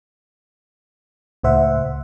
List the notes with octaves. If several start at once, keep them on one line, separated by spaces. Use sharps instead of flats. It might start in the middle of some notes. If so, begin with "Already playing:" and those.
C#2 A2 C5 E5 F#5